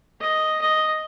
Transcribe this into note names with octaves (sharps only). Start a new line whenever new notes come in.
D#5
D#5